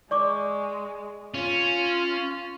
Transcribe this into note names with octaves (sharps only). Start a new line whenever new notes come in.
G#3 D5 C#6 D6
C#4 F4